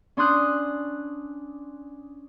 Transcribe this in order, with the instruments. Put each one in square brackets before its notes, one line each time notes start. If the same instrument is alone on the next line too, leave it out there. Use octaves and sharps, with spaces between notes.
[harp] C#4 D4 C6 D#6 F#6 G6